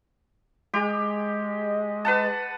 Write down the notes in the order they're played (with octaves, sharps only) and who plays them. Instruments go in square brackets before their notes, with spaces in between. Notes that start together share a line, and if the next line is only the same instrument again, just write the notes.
[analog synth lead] G#3 [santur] G4
[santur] B4 F#5 A5